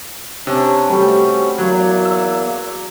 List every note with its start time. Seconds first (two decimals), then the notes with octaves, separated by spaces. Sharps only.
0.47 C3 C#4 D4 C#5
0.90 G3 A3 C4 C#4 F#4
1.58 E2 F#3 A#3 D5
2.05 E6